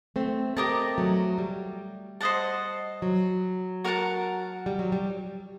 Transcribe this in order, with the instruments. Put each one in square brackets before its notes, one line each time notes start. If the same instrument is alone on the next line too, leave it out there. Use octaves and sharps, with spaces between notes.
[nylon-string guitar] A3 C4
[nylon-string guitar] A3 C4 [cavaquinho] G4 A#4 D#5 A5
[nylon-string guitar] F#3 A3
G3
[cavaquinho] C5 D#5 F#5 A5
[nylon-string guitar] F#3
[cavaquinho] F#4 A#4 F#5 A5
[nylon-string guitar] G3
F#3
G3